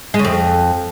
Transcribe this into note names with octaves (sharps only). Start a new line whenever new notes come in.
G#3
C#3
F2